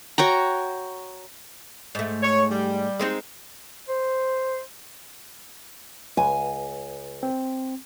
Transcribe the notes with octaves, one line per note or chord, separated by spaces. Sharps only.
F#4 C#5 G5 A#5
G#2 A3
C#5
G3
G#3 C4 D#4
C5
C#2 B4 G#5
C4